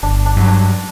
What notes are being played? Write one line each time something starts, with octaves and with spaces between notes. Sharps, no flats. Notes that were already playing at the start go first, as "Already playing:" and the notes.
G1 D4
D4
G2 F#3
D4